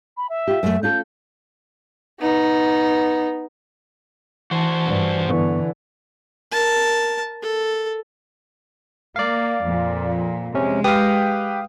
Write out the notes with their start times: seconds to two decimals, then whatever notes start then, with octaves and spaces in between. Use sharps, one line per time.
0.17 B5
0.29 E5
0.47 F4 G4
0.63 F#2 A3
0.83 C#4 F4 A4 G6
2.20 B3 D#4
4.51 E3 F#4 C5 A5
4.86 G2
5.29 G2 D3 E3 B3 C#6
6.52 A#4 A5
7.43 A4
9.16 A#3 D5 F5
9.61 F2 A#2
10.54 C3 G#3 C#4
10.84 G4 B4 F5 G5 D#6